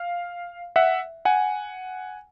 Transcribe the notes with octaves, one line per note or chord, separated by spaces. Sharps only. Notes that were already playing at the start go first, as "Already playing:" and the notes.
Already playing: F5
E5 F#5
F#5 G#5